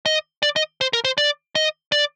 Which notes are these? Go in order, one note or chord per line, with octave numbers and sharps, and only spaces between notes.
D#5
D5
D#5
C5
A#4
C5
D5
D#5
D5